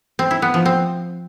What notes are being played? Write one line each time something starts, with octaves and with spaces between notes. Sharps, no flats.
C4
E4
B3
F3
C4